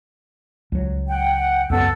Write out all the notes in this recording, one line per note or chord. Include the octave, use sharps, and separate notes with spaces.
C#2 F#3
F#5 G5
C#2 F#2 B3 A4 F#5 E6